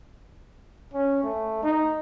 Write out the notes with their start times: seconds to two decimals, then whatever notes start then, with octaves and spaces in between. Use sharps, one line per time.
0.94 C#4
1.23 A3
1.63 D#4